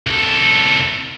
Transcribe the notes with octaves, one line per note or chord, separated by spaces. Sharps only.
C2 A4